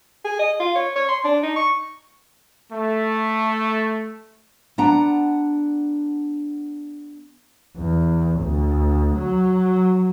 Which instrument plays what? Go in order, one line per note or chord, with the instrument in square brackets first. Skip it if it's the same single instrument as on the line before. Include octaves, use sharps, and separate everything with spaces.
[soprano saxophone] G#4
D#5
F4
C#5
C#5
C6
D4
D#4
C#6
[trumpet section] A3
[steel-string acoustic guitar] B3 D4 F#5 A#5
[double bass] E2
D2
F#3